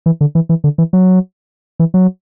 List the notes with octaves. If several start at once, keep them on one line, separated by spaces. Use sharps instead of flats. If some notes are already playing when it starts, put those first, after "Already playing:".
E3
D3
E3
E3
D3
E3
F#3
E3
F#3